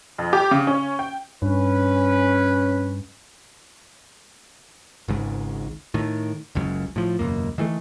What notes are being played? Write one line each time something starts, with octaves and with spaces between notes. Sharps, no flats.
F2
G4
C#3
C#4
G5
G2 C#4 B4
G#1 C#2 G#2
A2 D#3
F#1 C#2 F#2
A2 F3
E1 C#2 F#2 A#3
D#3 E3 G3 A3